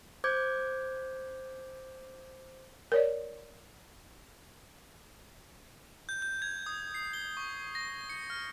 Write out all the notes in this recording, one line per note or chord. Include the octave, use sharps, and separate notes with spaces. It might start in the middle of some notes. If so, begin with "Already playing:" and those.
C5 D6 G6 G#6
A#4 C#5 D5
G6
G6
G#6
D#6
C7
G7
C#6
A#6
C#7
F6